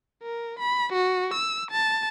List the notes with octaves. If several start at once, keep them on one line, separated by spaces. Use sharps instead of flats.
A#4
B5
F#4
E6
A5